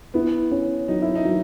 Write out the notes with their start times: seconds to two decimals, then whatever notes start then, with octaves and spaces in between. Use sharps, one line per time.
0.14 B3 E4
0.52 C#4
0.88 F#3 D#4
1.02 E4
1.15 D#4
1.25 F#3